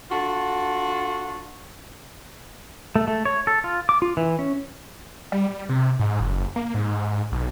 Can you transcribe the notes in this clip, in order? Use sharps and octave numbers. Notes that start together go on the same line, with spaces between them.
D4 F4 F#4 A4
A3
A3
C#5
A4
F4
D6
F4
E3
C#4
G3
G3
C3
G#2
F#1
A#3
G#2
B1